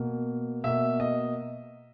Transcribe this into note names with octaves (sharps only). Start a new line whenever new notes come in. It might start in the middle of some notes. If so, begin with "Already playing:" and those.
Already playing: B2 A#3
B2 A#3 E5
D#5